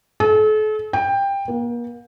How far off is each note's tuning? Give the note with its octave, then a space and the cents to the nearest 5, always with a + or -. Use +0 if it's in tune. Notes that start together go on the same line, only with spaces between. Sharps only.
A4 -40
G5 +15
A#3 +40